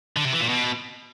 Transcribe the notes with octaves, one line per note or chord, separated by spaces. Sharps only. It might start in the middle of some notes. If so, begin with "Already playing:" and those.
D3
C3
E3
A#2
B2